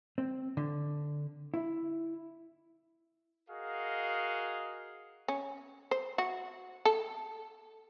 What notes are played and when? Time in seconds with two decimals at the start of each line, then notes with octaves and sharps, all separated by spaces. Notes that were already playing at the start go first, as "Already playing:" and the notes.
0.18 C4
0.57 D3
1.54 E4
3.49 F#4 G#4 A#4 D#5 F5
5.28 C#4
5.91 C5
6.18 F#4
6.85 A4